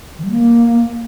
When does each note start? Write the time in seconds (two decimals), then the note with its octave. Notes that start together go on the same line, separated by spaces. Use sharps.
0.18 D#3
0.24 G3
0.30 A#3